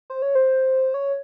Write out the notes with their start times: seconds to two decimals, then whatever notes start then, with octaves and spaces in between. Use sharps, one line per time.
0.10 C5
0.22 C#5
0.35 C5
0.94 C#5